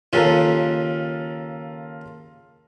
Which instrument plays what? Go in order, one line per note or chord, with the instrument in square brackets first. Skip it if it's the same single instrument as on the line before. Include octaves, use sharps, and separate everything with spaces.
[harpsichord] D#2 C#3 [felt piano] F4 A4 A#4